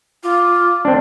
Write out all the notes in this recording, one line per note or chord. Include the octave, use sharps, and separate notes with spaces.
F4 D6
C4 D4